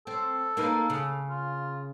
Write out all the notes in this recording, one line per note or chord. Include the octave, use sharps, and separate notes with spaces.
C4 A4
A#3 D#4 B4
C#3
F4